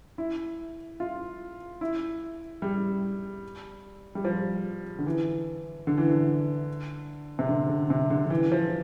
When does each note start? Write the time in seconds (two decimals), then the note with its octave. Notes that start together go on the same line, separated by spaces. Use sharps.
0.18 E4
1.00 F4
1.81 E4
2.62 G3
4.15 G3
4.25 F3
4.99 D3
5.06 E3
5.87 D3
5.98 E3
6.09 D3
7.39 C3
7.49 D3
7.69 D3
7.90 C3
8.10 D3
8.26 D3
8.30 E3
8.52 F3